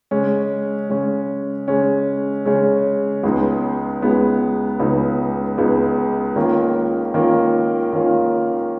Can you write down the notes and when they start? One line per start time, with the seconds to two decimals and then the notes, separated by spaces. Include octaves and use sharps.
0.11 C#3 G#3 C#4
0.89 C#3 G#3 C#4
1.68 C#3 G#3 C#4
2.46 C#3 G#3 C#4
3.23 C#2 C#3 G#3 B3 D#4
4.02 C#2 C#3 G#3 B3 D#4
4.80 C#2 C#3 G#3 B3 D#4
5.58 C#2 C#3 G#3 B3 D#4
6.36 D#3 A#3 C#4 F4
7.14 D#3 A#3 C#4 F4
7.93 D#3 A#3 C#4 F4